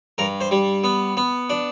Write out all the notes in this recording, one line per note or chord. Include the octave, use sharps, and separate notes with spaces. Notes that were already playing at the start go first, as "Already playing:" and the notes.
G2 A#4
C5
G3
B3
B3
D4